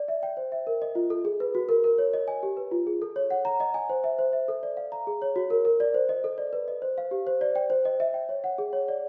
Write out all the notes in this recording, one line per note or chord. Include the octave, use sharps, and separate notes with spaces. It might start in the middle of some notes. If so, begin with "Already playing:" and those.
Already playing: D5
E5
G5
C5
E5
A#4
D#5
F4
A4
G#4
B4
F#4
A#4
A#4
C#5
D#5
G#5
G4
B4
F4
G#4
A4
C#5
F#5
A#5
D#5
G#5
C5
E5
C5
E5
A4
D5
F5
A#5
G#4
C#5
F#4
A#4
A#4
D5
C5
D#5
A4
D5
B4
D#5
C5
F5
G4
C5
D5
G5
C5
D#5
E5
G5
C#5
F#5
G#4
C#5
D5